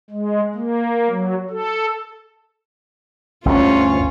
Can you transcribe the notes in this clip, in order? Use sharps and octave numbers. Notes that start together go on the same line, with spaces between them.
G#3
A#3
F#3
A4
G1 D2 C3 C#4 F4